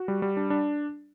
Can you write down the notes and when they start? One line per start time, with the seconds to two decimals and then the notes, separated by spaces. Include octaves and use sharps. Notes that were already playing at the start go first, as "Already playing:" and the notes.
Already playing: F#4
0.08 G3
0.22 G3
0.37 D4
0.50 D4